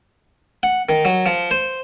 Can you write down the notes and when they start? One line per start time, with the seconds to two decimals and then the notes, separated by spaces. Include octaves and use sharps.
0.63 F#5
0.89 D#3
1.05 F#3
1.26 F3
1.51 C5